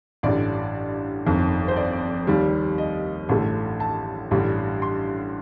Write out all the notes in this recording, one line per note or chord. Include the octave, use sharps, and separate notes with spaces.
A1 G2 D3 D5
G1 F2 D#3
C5
D5
D#2 D#3 G3
D#5
A1 G2 D3 A3
A5
A1 G2 D3 G3
C6